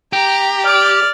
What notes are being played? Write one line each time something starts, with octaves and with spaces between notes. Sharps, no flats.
G4 A#5
D5 F6